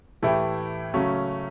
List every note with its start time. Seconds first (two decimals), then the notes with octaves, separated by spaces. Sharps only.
0.22 A2 E3 A3 E4 G4
0.94 C#3 F#3 A3 C#4